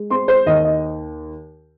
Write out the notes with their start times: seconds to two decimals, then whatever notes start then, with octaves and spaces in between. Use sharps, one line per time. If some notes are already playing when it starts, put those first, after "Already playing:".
Already playing: G#3
0.10 C4 C6
0.28 C5
0.46 D#2 D#5
0.64 D#5